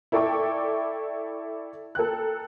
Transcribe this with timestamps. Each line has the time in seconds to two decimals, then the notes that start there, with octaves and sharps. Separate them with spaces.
0.12 E4 A4 D5 G5 C#6 D6
1.95 A4 A#4 G5 F#6